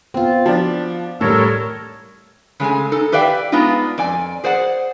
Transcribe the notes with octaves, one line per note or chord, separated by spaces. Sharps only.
B3 C4 F4
F3 D4 B5
A2 G3 A4 A#4 C#5 F6
C#3 G#3 A3 G#5
D#4 A4
G4 B4 D5 E5 F5 G5
G#3 B3 D4 D#4 F4
F2 D5 G#5
G#4 C5 D5 F#5